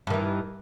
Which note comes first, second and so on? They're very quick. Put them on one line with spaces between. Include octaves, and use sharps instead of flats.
G2 D#3 E3